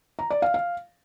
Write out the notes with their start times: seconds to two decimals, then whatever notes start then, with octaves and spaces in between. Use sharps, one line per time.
0.19 A#5
0.30 D5
0.42 F5
0.54 F5